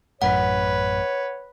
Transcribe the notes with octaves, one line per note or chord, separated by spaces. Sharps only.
A1 F#2 A2 B4 C#5 F#5